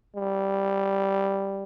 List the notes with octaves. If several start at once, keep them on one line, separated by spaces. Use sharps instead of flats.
G3